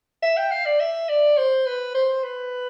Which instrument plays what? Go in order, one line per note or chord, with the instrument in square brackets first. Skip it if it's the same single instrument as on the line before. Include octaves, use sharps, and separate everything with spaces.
[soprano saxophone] E5
G5
F5
D5
E5
D5
C5
B4
C5
B4